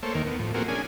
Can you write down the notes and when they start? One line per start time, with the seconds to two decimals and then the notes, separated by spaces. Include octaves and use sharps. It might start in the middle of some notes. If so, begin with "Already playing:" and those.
0.03 A3 A#3 A4 C5 C#5
0.15 D#2 D#3 A#3 A#4
0.27 B3
0.39 A2 F3
0.54 A3 A#3 C4 F#4 G#4 A#4
0.68 C#4 D4 G#4 G#5